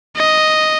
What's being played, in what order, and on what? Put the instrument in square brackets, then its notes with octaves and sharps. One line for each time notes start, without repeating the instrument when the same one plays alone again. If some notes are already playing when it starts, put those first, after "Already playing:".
[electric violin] D#5